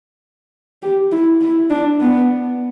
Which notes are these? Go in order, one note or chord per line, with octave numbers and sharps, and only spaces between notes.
G4
E4
E4
D4
B3